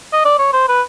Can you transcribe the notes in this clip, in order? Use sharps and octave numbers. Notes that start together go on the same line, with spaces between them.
D#5
D5
C#5
C5
B4